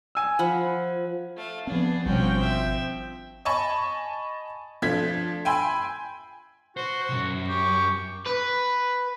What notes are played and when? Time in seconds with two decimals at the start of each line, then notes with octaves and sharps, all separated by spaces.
0.15 G#5 E6
0.39 F3 F#5 B5
1.36 A3 F5
1.67 F3 B3 C4 D4 G#4
2.06 G#1 B2 F3 G3 C4 C#4 F#4 G5
2.40 E5
3.45 D#5 G#5 A5 B5 C#6
4.82 F3 A3 D4 G#6 B6
5.45 G5 G#5 B5 C6 E6
6.77 F#4 C5
7.09 B1 F#2
7.48 G4 C#6
8.26 B4